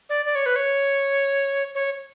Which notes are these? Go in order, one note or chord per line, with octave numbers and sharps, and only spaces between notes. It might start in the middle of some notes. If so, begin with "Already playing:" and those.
D5
D5
C#5
B4
C#5
C#5